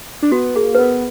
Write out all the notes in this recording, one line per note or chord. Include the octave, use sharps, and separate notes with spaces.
D4
B3 F#4
A#3 G#4
B4
B3 A#4